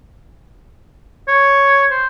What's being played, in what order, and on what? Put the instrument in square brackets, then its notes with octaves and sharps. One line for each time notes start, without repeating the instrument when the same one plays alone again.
[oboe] C#5
C5